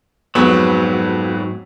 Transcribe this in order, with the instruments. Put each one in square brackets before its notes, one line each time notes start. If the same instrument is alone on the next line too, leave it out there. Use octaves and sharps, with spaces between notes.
[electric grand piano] F2 B3 [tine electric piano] G#2 E6 [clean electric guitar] F#3